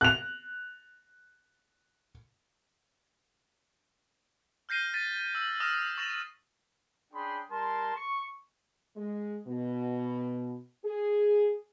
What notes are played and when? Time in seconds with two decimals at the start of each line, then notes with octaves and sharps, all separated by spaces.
0.01 F#6 F7
4.69 F6 G6 A#6 C7 D#7 G7
4.94 A6 B6 D#7
5.35 E6 F#7
5.60 D#6 F6 A#6 E7
5.98 C#6 A6 A#6 E7 F#7
7.13 C#4 D4 G#4 G5 B5 C6
7.51 G3 A#4 A5 C6
7.95 C#6
8.96 G#3
9.47 B2
10.85 G#4